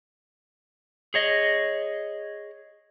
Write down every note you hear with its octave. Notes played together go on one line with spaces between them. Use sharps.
G#4 C#5 D#5